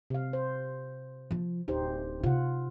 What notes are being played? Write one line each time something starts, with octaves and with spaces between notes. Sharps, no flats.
C3 F5
C5
F3 F4
D1 D#4 G4 C5
C3 F4 F#5